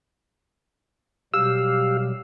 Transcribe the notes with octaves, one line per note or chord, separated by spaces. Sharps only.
B2 F#3 G3 G4 F5 E6